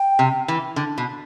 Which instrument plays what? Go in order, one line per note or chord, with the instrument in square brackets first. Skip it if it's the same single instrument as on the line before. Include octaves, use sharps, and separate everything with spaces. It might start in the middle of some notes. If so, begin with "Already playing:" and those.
Already playing: [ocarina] G5
[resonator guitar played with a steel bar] C3
E3
D3
B2